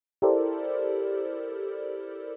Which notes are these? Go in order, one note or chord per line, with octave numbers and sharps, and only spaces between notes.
E4 G4 A4 A#4 C5 D5